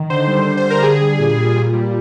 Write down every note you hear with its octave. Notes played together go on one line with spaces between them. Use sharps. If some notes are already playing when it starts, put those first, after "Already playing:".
Already playing: D#3
D3 C5
G3
D3
C5
G3
A#4
D3 G#4
G3
A#2
G3
A#2
G3